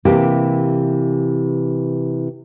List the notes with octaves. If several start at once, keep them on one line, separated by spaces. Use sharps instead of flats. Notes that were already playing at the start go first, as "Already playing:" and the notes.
C3 E3 A#3 G4